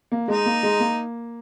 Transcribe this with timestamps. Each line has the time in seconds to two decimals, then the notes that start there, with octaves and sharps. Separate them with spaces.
0.12 A#3
0.28 G#3 D#4
0.46 A#3
0.63 G#3
0.80 A#3